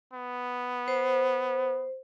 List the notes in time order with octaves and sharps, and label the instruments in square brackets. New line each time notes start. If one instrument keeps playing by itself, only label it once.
[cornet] B3
[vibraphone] C5